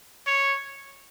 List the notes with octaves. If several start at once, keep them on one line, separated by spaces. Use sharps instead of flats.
C#5